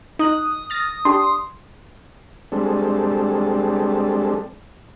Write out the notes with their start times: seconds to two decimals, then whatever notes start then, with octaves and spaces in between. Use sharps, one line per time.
0.19 D#4 D#6 F#6
0.70 F6 A6 A#6
1.05 D4 G4 C6
2.52 G3 G#3 C4 D4 A4